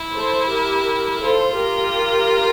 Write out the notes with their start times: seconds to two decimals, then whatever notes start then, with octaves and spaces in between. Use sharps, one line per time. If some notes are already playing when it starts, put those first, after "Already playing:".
Already playing: E4
0.14 A4 C5
0.51 G4 A#4
1.22 F4 A4 C5
1.58 G4 A#4